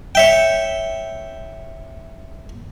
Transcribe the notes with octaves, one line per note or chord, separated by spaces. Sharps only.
C#5 E5 G5